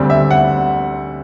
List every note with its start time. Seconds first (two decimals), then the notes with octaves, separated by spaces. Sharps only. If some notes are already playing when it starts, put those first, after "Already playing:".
Already playing: D2 D3 G3 C4
0.10 E5
0.31 F#5